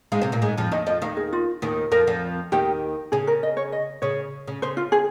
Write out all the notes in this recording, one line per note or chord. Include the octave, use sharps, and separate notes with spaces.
G#2 G#3 F5
C3 C4
A#2 A#3
G#2 G#3
F2 F3
D#2 D#3 D#5
F2 F3 D#5
D#2 D#3 F5
G#4
F4
D#2 D#3
F2 F3 A#4
F2 F3
D#2 D#3 G4
C#3 G#4
A#4
D#5
C#5
D#5
C#3 C#5
C#3
C#3 C5
F4
G#4